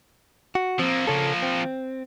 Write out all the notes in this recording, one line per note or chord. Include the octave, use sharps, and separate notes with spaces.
F#4
F3 A#3 C4
C#3 C#4 A4
C4